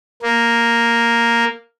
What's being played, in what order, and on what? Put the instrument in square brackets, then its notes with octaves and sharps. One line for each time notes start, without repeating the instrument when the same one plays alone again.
[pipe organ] A#3